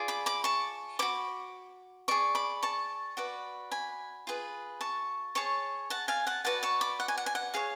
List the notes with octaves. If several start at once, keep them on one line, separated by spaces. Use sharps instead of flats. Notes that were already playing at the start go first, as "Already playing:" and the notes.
Already playing: F4 G#4 D5
B5 D6
B5 D6
A5 C#6
F#4 C#5 B5 D6
G#4 D5 A5 C#6
B5 D6
A5 C#6
F#4 B4 D5
G#5 B5
F4 G#4 B4
A5 C#6
G#4 C#5 A5 C#6
F#5 A5
F5 G#5
F#5 A5
F#4 B4 D5 F#5 A5
A5 C#6
B5 D6
F#5
G#5
F#5
G#5
F#5
G#4 C#5 F5